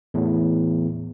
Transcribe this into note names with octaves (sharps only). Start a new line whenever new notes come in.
E2 A2